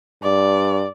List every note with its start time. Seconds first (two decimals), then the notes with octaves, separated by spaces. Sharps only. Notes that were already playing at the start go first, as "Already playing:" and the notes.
0.23 G2 D5